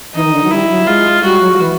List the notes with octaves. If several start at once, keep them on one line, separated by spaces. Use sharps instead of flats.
E3 D#4
D#3
D3
F#3
G3 E4
F#3
G#3 F4
G3 F#4
F#3
F3
E3